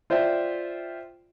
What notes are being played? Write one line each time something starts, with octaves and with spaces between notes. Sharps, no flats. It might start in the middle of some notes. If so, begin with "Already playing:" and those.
F4 C5 D5 E5 G5